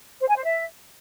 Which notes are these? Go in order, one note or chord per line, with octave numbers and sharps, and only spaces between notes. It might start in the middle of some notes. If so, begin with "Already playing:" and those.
C5
G#5
C5
E5